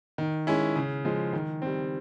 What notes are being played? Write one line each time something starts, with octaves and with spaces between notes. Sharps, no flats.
D#3
G#3 C#4 E4
C#3
F3 G#3
D#3
G3 C4